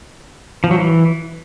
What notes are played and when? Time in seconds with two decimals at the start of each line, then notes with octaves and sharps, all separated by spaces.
0.64 F3
0.71 F#3
0.78 E3